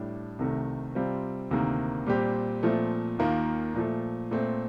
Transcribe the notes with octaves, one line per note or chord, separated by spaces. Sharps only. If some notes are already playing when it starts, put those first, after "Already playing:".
Already playing: A2 G3 D4
C2 C3 D#3 A3
C3 G3 C4 F4
D2 C3 D#3 A#3
A#2 G3 C4 G4
A#2 F3 A3 C4
D#2 D#3 A#3 F4
A#2 F3 A3
A#2 A3 C4